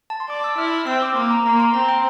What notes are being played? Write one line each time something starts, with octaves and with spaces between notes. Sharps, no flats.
A5
C6
D5 D6
E6
E4 F6
E6
F6
C4 E6
D6
A#3 C6
A#5
A#3 A#5
C6
C4 A#5
G5